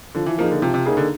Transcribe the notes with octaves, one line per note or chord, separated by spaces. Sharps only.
D3 F3
E3
F3 A#3 D#4 G#4
D3
C3 F3
C3
C#3 A#3 D#4 G#4
D3